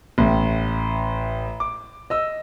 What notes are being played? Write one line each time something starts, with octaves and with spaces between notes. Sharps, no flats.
A1 A2
D6
D#5 E6